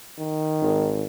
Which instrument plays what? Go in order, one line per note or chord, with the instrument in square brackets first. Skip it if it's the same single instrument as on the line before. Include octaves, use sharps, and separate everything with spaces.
[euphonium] D#3
[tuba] G#1